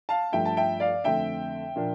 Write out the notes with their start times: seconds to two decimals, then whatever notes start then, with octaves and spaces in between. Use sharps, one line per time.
0.09 F5 A5
0.32 G2 F3 A3 E5 G5
0.45 A5
0.57 E5 G5
0.80 D5 F5
1.04 F2 D3 A3 C4 E5 G5
1.76 A#2 F3 A#3 D4